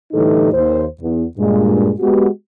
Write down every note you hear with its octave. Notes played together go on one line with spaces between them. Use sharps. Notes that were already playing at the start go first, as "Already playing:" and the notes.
A2 D3 E3 G3 D#4 A4
D#2 C5
E2
G2 A#2 G#3
G#3 B3 F#4 G4